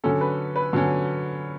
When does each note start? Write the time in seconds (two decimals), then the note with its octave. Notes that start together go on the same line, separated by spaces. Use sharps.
0.04 D3 F#3 C#4 A4
0.21 B4
0.56 B4
0.73 D3 F#3 C#4